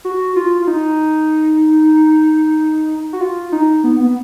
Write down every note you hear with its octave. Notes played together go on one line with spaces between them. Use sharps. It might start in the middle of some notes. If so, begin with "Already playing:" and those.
F#4
F4
F4
D#4
F#4
F4
D#4
B3
B3